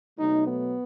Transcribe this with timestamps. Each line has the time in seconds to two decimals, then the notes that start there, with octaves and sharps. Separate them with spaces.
0.18 B2 F#3 A3 D#4
0.47 B3